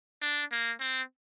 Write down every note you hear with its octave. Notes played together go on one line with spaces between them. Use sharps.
D4
A#3
C4